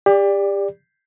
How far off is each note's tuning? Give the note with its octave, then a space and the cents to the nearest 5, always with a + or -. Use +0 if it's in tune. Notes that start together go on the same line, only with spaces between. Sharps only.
G4 +30 D5 +0